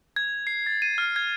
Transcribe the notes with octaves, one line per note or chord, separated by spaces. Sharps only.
G#6
C7
A6
D#7
F6
G#6